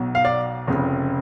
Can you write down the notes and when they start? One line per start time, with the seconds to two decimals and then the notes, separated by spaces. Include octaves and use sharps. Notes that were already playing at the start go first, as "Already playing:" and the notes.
Already playing: B1 B2 F#3
0.15 F5
0.25 D5
0.67 F1 F2 C#3